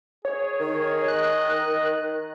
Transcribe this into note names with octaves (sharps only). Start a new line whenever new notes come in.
G#4 C#5
D#3
D#5 F#6